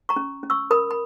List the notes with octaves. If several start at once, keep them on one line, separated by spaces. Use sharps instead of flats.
A#5 C#6
C#4
C#4
C#6 E6
A#4 B5 D#6
B5